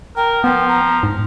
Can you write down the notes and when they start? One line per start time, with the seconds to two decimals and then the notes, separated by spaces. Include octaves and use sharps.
0.17 A#4 G5
0.44 F3 B3 G5
0.69 A#5
1.03 G#2